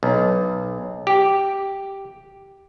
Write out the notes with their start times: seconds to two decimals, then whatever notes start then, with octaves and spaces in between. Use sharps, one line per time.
0.03 B1
1.07 G4